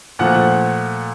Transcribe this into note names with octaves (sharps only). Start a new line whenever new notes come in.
A#2 F3 A3 F#5